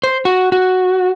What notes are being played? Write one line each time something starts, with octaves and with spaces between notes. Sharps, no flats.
C5
F#4
F#4